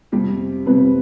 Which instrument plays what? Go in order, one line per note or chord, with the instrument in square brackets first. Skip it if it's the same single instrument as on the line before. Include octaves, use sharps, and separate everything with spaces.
[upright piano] F2 C3 G3 G4
F2 C3 G3 B4